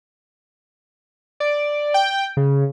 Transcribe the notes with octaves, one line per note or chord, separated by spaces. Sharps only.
D5
G5
C#3